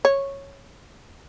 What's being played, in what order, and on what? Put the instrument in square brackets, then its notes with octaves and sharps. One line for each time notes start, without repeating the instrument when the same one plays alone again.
[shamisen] C#5